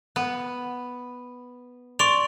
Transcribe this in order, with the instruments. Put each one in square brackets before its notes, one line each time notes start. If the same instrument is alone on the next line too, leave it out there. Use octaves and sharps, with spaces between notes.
[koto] B3
[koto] D5 [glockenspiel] C6 C#6 F7